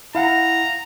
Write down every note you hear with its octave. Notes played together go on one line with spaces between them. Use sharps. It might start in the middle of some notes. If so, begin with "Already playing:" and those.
E4 F5 F#5 A#5